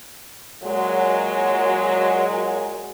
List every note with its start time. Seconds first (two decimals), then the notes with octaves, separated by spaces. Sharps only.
0.63 A#2 F#3 G#3